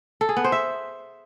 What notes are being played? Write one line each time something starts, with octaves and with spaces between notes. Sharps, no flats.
A4
G#4
B3
C5
E5